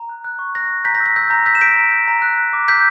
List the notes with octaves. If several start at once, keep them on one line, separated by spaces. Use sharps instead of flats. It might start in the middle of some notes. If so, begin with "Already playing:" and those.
Already playing: A#5
F#6
F#6
C#6
F#6 A#6
F#6
A#5 G6 B6
A#6
E6
A#6
E6 G6
A#5 A#6
E6 G6 B6
E7
G6 B6 D7
A#5
G6
A#5
F#6
F#6
D6
E6 G6 B6